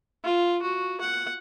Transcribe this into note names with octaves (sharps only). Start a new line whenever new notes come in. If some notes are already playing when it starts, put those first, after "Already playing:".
F4
F#4
F#5